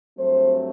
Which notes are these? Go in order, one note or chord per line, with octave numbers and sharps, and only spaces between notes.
G2 F#3 A3 C4 C5